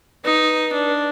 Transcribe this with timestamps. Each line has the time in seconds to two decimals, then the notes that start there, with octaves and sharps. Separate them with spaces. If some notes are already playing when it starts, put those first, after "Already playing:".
0.24 D#4 B4
0.73 D4